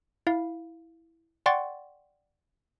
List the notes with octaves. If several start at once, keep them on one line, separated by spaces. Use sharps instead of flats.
E4 F5
D5 F#5 G5 C6 C#6 A6